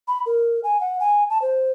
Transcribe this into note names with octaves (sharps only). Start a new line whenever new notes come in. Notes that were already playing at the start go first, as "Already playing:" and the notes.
B5
A#4
G#5
F#5
G#5
A5
C5